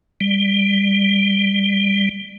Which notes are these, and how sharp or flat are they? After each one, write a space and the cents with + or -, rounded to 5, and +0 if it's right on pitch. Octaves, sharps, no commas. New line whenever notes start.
G3 +20